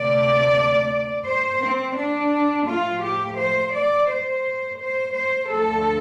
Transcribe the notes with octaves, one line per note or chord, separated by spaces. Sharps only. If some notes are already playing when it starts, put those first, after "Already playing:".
Already playing: D2 C3 A3 D5
C5
C4
D4
A2 F3 A3 F4
G4
C5
D5
C5
C5
C5
D2 D3 F3 A3 A4